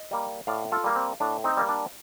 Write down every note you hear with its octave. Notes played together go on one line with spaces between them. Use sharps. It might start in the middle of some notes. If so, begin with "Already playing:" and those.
Already playing: D#5
G3 A#3
A2 D5 F5
F4 A4
G3 A#3
C4
A2 D4
C4 D#4
G3 A#3
D4